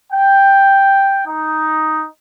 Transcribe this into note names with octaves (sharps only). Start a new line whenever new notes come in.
G5
D#4